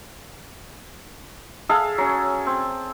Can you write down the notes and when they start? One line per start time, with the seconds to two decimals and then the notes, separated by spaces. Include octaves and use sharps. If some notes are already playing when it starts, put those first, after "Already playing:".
1.69 G#4 A4 E5 F5
1.98 F#3 C#4
2.47 C4